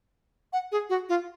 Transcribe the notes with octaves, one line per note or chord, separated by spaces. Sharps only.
F#5
G#4
F#4
F4